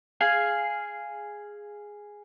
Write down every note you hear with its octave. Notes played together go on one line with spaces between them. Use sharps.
G#4 F5 G#5